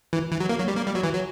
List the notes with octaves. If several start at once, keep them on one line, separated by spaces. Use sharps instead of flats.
E3
E3
F#3
A#3
F#3
G3
A#3
G3
F#3
E3
F#3